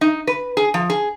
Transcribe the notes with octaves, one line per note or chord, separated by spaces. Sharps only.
D#4
B4
G#4
F3
G#4